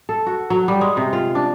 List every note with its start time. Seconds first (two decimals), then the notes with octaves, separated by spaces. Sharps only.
0.09 A4
0.27 F#4
0.50 F#3
0.68 G3
0.81 G#3
0.97 C3
1.13 F4
1.35 D4